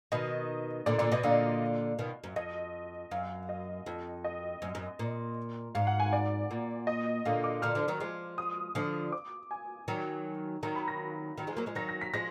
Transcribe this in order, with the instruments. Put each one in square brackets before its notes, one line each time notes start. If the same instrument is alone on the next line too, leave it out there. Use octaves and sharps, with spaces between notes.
[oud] B2 D#3 [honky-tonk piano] D#5
[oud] A#2 D3 [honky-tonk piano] D5
[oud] A#2 D3 [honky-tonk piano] D5
[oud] B2 [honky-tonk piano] D#5
[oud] A#2 D3 [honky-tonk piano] F5
[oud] B2 D#3
F#2
[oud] F2 [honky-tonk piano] D#5
[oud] F#2 [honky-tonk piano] F5
[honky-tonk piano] D#5
[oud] F2
[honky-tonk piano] D#5
[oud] F#2
F#2
A#2
[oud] G#2 [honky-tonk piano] F5
[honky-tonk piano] F#5
G#5
D5
[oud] A#2
[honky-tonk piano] D#5
[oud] A#2 D3 [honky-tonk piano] F5
[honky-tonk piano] D6
[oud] A#2 D3 [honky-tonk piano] F6
[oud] D3 F3
D#3 F#3
F3 G#3
[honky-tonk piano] D#6
[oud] D3 F3
[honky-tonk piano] D6
G#5
[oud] D#3 F#3
[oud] D#3 F#3 [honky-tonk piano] A#5
[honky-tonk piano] B5
A#6
[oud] D#3 F#3
F3 G#3
F#3 A#3
F3 G#3
[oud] D#3 F#3 [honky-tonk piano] A#6
[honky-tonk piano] A#6
B6
[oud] F3 G#3 [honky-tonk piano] A#6